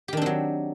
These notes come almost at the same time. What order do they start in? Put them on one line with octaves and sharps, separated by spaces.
G4 D#3 D4 C4 F#3